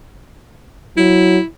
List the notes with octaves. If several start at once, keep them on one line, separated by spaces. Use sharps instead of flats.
F#3 E4